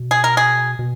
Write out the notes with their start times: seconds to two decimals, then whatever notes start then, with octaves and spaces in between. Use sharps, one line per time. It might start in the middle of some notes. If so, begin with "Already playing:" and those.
Already playing: B2
0.11 G#4
0.24 A#4
0.37 G#4
0.79 B2